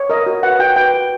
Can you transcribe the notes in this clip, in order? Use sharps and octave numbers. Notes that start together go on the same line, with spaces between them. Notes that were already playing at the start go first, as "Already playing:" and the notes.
Already playing: C#5
A#4 D#5
F#4
B4 F#5
F#4 G5
B4 G5
F#4